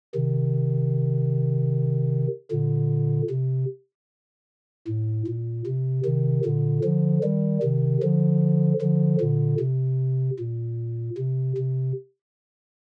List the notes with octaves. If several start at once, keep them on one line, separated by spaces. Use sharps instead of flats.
C3 D#3
A#2 D3
C3
A2
A#2
C3
C3 D#3
A#2 D3
D3 F3
D#3 G3
C3 D#3
D3 F3
D3 F3
A#2 D3
C3
A#2
C3
C3